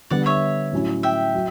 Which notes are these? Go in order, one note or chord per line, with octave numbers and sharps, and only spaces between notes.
D3 G3 B3 D5 F#5
C#5 E5
A2 F#3 C#4 E4
E5 G5
F#3